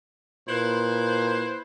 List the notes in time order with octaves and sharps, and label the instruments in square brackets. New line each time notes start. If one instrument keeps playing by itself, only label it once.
[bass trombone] A#2 [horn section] E4 B4 C5